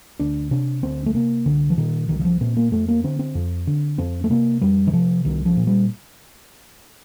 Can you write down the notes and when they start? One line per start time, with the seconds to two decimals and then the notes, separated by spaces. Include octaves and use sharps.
0.19 D2 D4
0.51 C3 D4
0.83 D2 C4
1.06 A3
1.14 C3 A#3
1.45 C2 D3
1.70 F3
1.77 A#2 D#3
2.09 C2 D#3
2.19 D#3
2.25 F3
2.41 A#2 C4
2.57 A#3
2.72 F2 A3
2.88 A#3
3.04 D3 C4
3.19 C4
3.35 F2
3.67 D3
3.98 F2 C4
4.24 A3
4.30 C3 A#3
4.61 F2 G3
4.87 D#3
4.93 C3 F3
5.25 C2 D#3
5.45 F3
5.56 A#2
5.67 G3